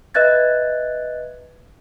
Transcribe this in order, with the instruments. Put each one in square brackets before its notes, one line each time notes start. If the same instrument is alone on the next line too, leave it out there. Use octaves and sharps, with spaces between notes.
[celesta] B4 D#5 E5 F#6 G#6 A6